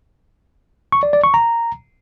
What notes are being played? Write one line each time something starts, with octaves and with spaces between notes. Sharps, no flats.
C#6
D5
D5
C#6
A#5